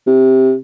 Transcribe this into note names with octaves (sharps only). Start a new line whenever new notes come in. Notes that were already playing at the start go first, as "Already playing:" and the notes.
C3